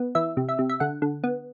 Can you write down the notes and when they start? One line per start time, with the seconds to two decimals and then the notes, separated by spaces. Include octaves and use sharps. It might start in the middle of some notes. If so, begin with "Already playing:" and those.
Already playing: B3
0.15 E3 E5
0.37 C3
0.49 E5
0.59 C3
0.69 E5
0.80 D3 F#5
1.02 D3
1.24 B3